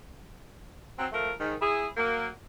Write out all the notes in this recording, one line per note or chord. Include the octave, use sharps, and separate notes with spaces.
F#3 C4
F3 A3 A#4
G#2 D#3
E4 G#4
F#3 A#3